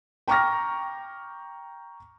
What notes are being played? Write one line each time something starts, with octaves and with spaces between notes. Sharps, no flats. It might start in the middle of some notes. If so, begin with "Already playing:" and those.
G5 A#5 C#6 D6 F6 A#6